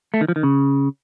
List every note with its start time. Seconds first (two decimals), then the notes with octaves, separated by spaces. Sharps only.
0.14 A3
0.21 D#3
0.28 F3
0.36 D#3
0.43 C#3